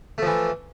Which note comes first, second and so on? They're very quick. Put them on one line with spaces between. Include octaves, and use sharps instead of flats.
A3 F3 E3